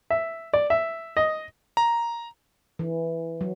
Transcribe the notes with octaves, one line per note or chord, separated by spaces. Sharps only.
E5
D5
E5
D#5
A#5
E3
F#3